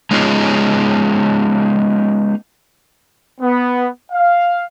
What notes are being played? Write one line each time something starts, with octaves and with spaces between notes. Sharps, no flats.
G#3 B3 C#4 D#4 F4 G#4
B3
F5